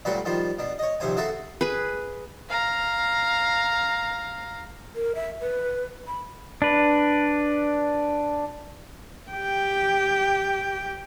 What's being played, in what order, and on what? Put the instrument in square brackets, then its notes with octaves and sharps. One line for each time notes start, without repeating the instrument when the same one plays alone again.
[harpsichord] D2 A#2 F#3 G3 F#4 B4
D#3 F3 G3 F4
B2 D4
C#5 D#5
A#1 D#2 C3 C5 G#5
C#3 F#4 A4 E5 C6
[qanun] G#4 B4
[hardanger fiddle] F5 A#5
[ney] A#4
E5
B4
B5
[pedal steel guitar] D4 B4
[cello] G4 G5